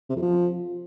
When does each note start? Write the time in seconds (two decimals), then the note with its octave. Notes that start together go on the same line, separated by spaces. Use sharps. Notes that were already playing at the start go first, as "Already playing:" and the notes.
0.10 C3
0.16 F2
0.22 F3